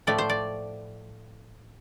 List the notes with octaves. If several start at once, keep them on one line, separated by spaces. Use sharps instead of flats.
A2 F3 A3 D5
C5
D5